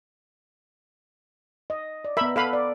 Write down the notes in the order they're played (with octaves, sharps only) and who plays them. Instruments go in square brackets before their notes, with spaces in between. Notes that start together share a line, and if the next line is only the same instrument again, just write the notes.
[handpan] D#5
D5
[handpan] B3 A#4 [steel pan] E5 B5
[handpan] A4 [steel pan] B4 F5 B5
[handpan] D5